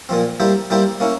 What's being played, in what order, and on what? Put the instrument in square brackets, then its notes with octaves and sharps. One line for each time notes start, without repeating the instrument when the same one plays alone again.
[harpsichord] A#2 F3 C4
G3 A#3 E4 G4 C5
G3 A#3 E4 G4 C5
A#3 C#4 E4